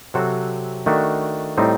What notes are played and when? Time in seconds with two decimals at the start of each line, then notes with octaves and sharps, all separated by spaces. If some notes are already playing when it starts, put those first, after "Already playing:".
0.14 C3 F#3 C4 F#4 A4
0.86 D#3 A3 D4 F#4
1.58 A2 G3 C4 D#4